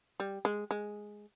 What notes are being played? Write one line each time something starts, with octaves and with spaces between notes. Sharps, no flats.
G3
G#3
G#3